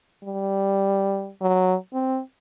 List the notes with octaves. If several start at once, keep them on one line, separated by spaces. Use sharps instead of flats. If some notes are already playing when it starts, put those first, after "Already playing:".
G3
F#3
C4